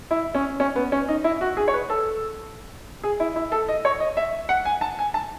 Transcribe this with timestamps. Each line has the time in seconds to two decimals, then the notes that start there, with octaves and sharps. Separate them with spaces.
0.11 E4
0.35 C#4
0.60 C#4
0.76 B3
0.92 C#4
1.08 D#4
1.24 E4
1.41 F#4
1.57 G#4
1.68 C#5
1.73 B4
1.90 A4
3.03 G#4
3.20 E4
3.36 E4
3.52 A4
3.68 D#5
3.85 C#5
4.00 D#5
4.17 E5
4.49 F#5
4.65 G#5
4.81 A5
4.99 G#5
5.14 A5